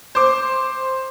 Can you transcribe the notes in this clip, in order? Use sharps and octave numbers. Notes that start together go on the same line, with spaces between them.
C5 D6